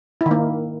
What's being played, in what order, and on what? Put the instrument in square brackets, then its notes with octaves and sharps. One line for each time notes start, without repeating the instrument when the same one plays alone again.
[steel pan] E4
D#3
A#3